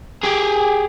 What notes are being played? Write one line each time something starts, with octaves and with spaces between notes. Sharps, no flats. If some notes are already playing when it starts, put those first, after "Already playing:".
G4 G#4